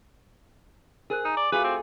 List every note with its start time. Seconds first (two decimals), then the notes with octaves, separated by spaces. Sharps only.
1.10 G#4 A#4 C5 F#6
1.25 D#4 A#5
1.37 D5 D6
1.52 A3 F4 F#4 G#4 B4 F5 D6
1.64 C4